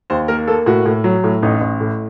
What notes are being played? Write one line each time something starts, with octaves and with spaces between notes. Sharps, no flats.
D#2 C5
A#3 A#4
A#3 A4
A2 F#4
A2
F#3
A2
A1 D#4
A1
A2